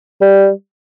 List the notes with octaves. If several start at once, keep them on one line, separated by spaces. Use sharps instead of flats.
G3